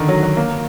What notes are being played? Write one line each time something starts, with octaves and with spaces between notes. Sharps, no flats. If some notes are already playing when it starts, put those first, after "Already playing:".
Already playing: D3 D#3
F#3
F#3
A#3